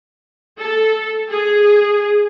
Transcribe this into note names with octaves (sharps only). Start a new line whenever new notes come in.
A4
G#4